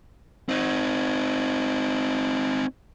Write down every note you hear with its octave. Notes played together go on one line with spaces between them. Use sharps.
C4 D#4